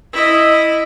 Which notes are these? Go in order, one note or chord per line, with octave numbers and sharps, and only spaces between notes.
E4 D#5